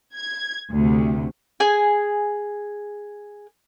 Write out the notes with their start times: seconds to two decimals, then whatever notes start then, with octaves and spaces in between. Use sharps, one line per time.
0.16 G#6
0.71 D2 C3
1.60 G#4 G#5